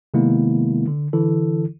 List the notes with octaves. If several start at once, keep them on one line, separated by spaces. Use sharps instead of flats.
C3 D#3 G#3 A#3 B3 E4
D3
D3 E3 E4 A4